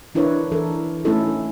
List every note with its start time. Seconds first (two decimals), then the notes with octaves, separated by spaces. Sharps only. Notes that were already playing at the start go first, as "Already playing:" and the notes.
0.15 E3 D4 E4 A#4 B4 C#5
0.52 E3 A4 A#4
1.05 A3 C#4 D#4 E4 A4